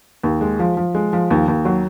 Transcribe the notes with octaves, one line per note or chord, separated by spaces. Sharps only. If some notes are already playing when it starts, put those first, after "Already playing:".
D#2
G#3
F3
F3
G#3
F3
D#2
D#2
F#3